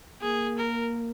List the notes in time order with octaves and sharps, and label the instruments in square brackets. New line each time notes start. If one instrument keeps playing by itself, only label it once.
[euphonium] A#3 [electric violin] G#4
[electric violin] A#4